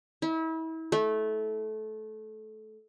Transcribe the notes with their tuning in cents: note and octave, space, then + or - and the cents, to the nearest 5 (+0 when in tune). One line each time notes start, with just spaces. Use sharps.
E4 -35
A3 -20